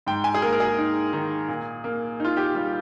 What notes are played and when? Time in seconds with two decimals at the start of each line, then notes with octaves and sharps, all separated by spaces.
0.07 G#2 G5
0.24 G#5
0.34 G#4
0.42 A#3 A#4
0.53 A#4
0.60 G#4
0.78 D#4
1.13 D#3
1.48 A#2
1.84 A#3
2.20 D#4 F4
2.37 G4
2.55 G3 F4